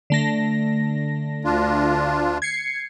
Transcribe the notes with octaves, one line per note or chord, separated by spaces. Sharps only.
D3 A3 A#6
D2 D4 F4
G#6 C7 C#7